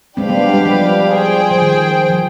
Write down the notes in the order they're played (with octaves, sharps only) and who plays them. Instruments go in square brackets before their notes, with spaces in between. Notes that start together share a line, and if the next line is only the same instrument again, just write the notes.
[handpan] G#3 C4 [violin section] D4 G4 B4 F5
[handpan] G3 B3
G3
F3
[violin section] G#4 C5 G5
[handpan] F3
D#3
F3